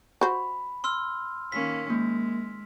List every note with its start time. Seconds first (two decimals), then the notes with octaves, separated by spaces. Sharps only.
0.21 F#4 C5 B5
0.84 C6 E6 F6
1.52 D#3 A#3 C#4 B6
1.90 G#3 A#3